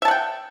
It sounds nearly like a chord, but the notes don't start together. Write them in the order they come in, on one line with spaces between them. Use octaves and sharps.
E5 A5 F#5 G5